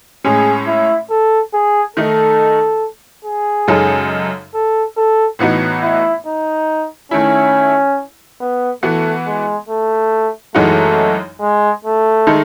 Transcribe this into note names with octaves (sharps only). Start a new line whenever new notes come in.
A2 G#3 C#4 G#4
E4
A4
G#4
D#3 A3 D#4 A4
G#4
F#2 C#3 G#3 D#4 A4
A4
A4
A2 E3 B3 D#4 F#4
E4
D#4
D#3 A3 C#4 E4
B3
E3 A3 B3 F#4
G#3
A3
F#2 E3 G#3 A3 D#4 F#4
G#3
A3
D#3 G#3 D#4 A4